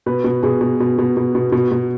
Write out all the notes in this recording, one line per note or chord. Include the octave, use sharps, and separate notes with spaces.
B2 B4
B2
B2 G#4
B2
B2
B2
B2
B2
B2
B2